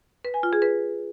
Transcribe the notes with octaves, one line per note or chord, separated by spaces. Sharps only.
B4
G#5
F4
G#4
B4